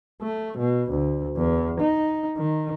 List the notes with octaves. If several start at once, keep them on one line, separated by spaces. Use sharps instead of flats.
A3
B2
D2
E2
D#4
D#3